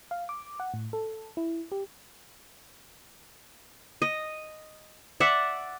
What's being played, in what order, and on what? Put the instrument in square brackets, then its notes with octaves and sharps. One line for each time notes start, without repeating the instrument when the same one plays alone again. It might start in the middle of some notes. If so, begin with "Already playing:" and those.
[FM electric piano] F5
D6
F#5
A2
A4
E4
G4
[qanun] D#5
D5 E5 F#5